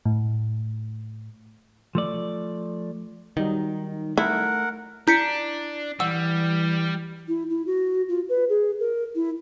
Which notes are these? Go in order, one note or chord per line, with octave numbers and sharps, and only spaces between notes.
A2
F3 A3 D5
D#3 F#3 G3 D#4
A3 E4 A#4 F#5
D4 E4 G6 B6 C#7
E3 G3 F#5 E6
E4
E4
F#4
F4
B4
G#4
A#4
E4